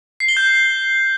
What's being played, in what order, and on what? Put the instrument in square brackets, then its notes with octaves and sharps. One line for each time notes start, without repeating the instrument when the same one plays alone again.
[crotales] C7
G7
G6